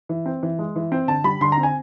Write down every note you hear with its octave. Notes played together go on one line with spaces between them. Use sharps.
E3
C4
E3
G#3
E3
C4
D3 A5
G3 B5
D3 C6
A#5
C4
G#5